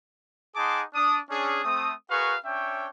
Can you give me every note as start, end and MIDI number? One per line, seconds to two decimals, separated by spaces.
0.56 0.82 63
0.56 0.82 68
0.56 0.82 78
0.56 0.82 81
0.56 0.82 84
0.56 0.82 86
0.94 1.19 62
0.94 1.19 87
1.30 1.64 61
1.30 1.64 62
1.30 1.64 68
1.64 1.92 57
1.64 1.92 60
1.64 1.92 87
2.10 2.37 66
2.10 2.37 68
2.10 2.37 70
2.10 2.37 71
2.10 2.37 77
2.10 2.37 85
2.45 2.88 61
2.45 2.88 62
2.45 2.88 73
2.45 2.88 76
2.45 2.88 79